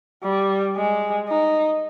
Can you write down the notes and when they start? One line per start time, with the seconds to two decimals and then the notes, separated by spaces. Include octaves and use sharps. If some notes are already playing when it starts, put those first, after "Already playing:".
0.23 G3
0.76 G#3
1.28 D#4